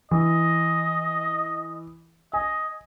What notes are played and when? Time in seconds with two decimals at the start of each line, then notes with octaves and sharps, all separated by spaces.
0.11 E3 D#5
2.33 D#5 G#5